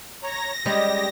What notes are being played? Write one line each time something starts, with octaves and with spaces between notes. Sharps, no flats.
C#5 A#5 A#6
G3 G#3 C#4 G4 D#5